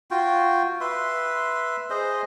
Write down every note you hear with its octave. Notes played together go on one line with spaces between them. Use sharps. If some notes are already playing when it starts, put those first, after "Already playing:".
F4 F#4 G5
B4 E5 C6
G#4 C5 D#5